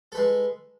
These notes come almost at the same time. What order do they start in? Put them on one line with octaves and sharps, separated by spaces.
A4 B4 G#3